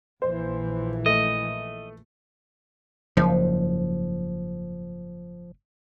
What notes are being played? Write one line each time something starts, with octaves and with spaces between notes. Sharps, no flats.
A#1 E3 C5
A3 D#5
F#1 G#2 F3